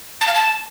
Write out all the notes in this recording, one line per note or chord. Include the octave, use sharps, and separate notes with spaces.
A5
F5
A5